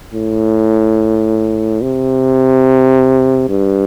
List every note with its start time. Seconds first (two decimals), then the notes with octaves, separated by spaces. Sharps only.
0.14 A2
1.82 C3
3.49 G2